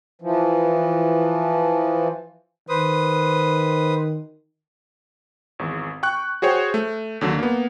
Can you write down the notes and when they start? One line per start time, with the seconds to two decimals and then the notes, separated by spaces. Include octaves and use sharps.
0.22 E3 F3
2.69 D#3 B4 C5 D#6
5.59 G#1 E2
6.03 G5 C#6 F#6
6.42 F#4 G#4 C5 C#5 G5
6.74 A3
7.21 D#2 D3 F#3
7.39 A#3 B3